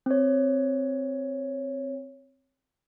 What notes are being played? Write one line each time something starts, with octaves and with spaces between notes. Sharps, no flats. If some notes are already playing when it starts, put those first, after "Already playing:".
C4 C#5